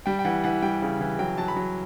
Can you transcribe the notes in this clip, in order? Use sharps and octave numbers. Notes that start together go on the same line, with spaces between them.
G3 G5
G5
E3 F#5
E3 F#5
G3 G5
C#3
E3
F#3 G5
F#3 A5
B5
F#3